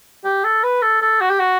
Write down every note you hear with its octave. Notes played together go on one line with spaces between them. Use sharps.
G4
A4
B4
A4
A4
F#4
G4
F#4